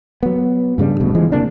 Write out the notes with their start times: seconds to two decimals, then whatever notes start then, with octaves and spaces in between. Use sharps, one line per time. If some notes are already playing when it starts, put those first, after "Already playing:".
0.23 F#3 B3
0.78 G2 C#3 G3 D4
1.00 D#1 D2 B2
1.15 E3 F3 G#3
1.32 F1 C3 A#3 D4